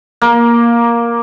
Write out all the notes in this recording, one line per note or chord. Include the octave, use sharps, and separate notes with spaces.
A#3